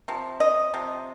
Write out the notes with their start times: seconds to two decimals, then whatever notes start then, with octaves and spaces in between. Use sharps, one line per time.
0.08 C3 F3
0.40 D#5
0.74 C3 F3